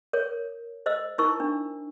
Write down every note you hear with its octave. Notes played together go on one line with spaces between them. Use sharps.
A#4 C#5
C5 D#5 E6
D#4 E4 A#4 C#6 E6
D4